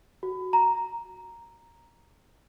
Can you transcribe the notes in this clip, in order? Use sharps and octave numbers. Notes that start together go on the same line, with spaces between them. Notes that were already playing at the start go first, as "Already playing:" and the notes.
F#4
A#5